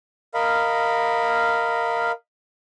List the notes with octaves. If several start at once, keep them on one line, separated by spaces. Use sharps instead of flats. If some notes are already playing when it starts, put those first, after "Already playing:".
A#4 D#5 F5 B5